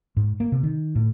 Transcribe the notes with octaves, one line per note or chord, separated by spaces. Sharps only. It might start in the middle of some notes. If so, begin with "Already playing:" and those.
G#2
A#3
C3
D#3
A2